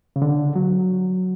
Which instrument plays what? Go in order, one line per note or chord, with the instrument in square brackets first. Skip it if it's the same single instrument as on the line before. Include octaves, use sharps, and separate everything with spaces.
[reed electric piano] C#3
D3
F#3